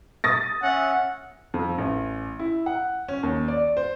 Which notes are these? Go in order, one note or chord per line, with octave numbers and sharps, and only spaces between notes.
D#6 A6 A#6
C#4 E5 F#5
F2
A1
E4
F#5
C#4
D#2
D5
C5